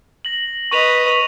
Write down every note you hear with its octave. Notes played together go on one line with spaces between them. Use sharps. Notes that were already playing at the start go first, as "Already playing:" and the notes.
A#6 F#7
B4 D#5 C#6 D#7 F7